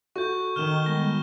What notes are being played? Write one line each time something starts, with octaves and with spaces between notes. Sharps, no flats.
F#4 A4 C#6 G6
D#3 F6 E7 G7
G3 G#3 B3 A#6